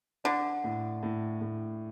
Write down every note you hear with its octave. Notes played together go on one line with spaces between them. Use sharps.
D3 D4
A2
A2
A2